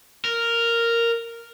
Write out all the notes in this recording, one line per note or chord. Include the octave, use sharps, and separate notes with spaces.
A#4